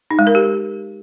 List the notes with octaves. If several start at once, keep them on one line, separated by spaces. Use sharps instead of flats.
D#4
G#3
A#4
G4